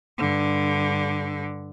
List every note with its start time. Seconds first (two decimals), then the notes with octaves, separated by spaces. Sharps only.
0.18 G2 D3